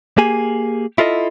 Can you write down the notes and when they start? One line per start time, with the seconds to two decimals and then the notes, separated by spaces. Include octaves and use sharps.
0.18 A#3 G4 G#4 G#5
0.98 E4 F4 A4 D#5